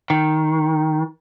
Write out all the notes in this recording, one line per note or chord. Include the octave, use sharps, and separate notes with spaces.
D#3